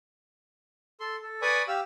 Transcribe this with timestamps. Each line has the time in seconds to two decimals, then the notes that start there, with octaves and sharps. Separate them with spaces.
1.00 A4 C6
1.22 A4
1.42 B4 D5 G#5 B5 C#6 D#6
1.68 G4 F5 E6